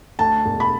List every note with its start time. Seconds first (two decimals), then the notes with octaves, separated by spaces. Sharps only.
0.19 D2 A5
0.46 E1
0.60 B5